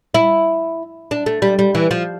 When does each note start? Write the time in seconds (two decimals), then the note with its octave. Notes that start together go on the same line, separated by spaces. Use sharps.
0.14 E4
1.11 D4
1.26 A3
1.42 G3
1.59 G3
1.75 E3
1.91 F3